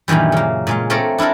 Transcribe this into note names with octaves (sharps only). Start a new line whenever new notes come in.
F#2 A#2 D#3 E3 G3
C#3 A#3
A#2 G#3 F5
A3 C4 A#4 C#5 D5
D4 E4 F4 A4 A#4